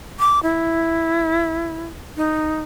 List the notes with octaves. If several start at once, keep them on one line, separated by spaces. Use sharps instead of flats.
D6
E4
D#4